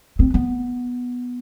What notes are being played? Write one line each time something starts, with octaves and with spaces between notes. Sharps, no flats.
C4
B3